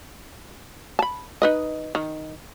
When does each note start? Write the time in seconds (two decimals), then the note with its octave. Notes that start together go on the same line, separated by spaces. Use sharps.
0.99 A5 B5
1.42 D#4 B4 D#5
1.95 D#3